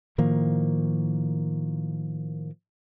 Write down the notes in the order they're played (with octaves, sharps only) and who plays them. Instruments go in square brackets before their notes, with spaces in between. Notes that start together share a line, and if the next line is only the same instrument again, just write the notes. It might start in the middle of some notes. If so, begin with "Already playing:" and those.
[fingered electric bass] A2 D#3 F3 A#3